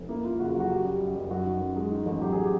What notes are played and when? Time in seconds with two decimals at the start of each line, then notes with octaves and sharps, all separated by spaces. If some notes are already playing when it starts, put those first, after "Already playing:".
Already playing: F1
0.09 A#3 E4
0.25 A#3 F4
0.40 C#3 F#4
0.50 F#4
0.55 F#3
0.60 F#4
0.70 F#1 G4
0.85 G3
1.00 F#2
1.16 F#1
1.31 F#2 F#4
1.46 D#3
1.61 F#2
1.76 G#3
1.92 D#3
2.06 A1
2.21 F#3 G4
2.33 G#4
2.44 G4